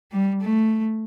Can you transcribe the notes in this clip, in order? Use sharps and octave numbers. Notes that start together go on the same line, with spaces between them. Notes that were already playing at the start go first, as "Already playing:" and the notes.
G3
A3